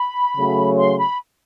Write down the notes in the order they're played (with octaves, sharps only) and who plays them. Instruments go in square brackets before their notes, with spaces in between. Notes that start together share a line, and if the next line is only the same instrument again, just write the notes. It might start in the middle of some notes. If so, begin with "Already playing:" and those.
Already playing: [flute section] B5
[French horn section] C#3 F#3 A3
[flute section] C6
B5